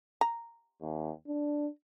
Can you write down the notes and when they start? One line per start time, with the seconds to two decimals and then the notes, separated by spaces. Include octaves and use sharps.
0.21 A#5
0.81 D#2
1.27 D4